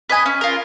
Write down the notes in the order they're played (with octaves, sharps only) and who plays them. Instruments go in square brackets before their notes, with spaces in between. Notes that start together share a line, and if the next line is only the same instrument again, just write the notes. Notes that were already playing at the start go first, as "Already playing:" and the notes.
[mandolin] B4 D#5 G#5
C#4
F4 A#4